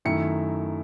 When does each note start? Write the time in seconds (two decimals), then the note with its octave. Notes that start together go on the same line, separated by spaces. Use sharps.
0.05 F#2 D#3 A3 E4 C#7